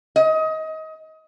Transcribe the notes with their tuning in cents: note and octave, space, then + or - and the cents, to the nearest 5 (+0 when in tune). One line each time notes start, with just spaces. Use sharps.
D#5 +25